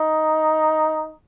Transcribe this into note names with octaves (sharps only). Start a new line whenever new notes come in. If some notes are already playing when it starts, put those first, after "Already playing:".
Already playing: D#4